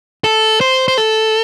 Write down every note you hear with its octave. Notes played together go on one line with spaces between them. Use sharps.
A4
C5
C5
A4